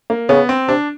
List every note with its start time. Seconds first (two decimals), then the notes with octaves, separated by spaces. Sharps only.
0.10 A#3
0.29 C#3 B3
0.49 C4
0.68 C3 D4